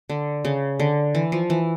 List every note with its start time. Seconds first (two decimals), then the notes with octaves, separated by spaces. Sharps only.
0.09 D3
0.45 C#3
0.80 D3
1.15 E3
1.32 F3
1.50 E3